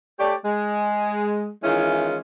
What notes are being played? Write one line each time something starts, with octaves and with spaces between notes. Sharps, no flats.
A3 G4 C#5 D5
G#3
D#3 E3 G#3 C#4 E4 F4